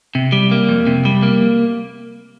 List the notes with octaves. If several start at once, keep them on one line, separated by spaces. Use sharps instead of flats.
C3
G3
A#3
F2
C3
G3
A#3